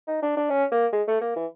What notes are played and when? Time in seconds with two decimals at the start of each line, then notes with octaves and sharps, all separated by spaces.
0.08 D#4
0.22 D4
0.37 D4
0.50 C#4
0.72 A#3
0.92 G#3
1.07 A3
1.21 A#3
1.36 E3